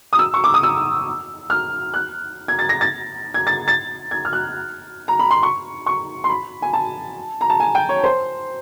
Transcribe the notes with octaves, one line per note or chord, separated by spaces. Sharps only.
D#6
E6
C#6
D6
D#6
E6
F6
F#6
G#6
A6
A#6
A6
G#6
A6
A6
G#6
F6
F#6
A#5
B5
C6
C#6
C#6
C6
B5
G#5
A5
A#5
A5
G#5
G5
C#5
C5